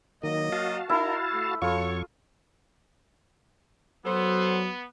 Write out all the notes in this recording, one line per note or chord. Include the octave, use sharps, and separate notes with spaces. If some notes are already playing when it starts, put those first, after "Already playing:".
D#3 F#3 A#3 D#5
F#4 F5 A5
D#4 E4 A#4 B5
A3
F2 F4 F#4 A4 C#5 C#6
F#3 B3 A4 C5